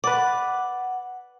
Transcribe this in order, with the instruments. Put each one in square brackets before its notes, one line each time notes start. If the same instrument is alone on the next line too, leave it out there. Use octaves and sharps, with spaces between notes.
[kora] B4 D5 [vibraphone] F#5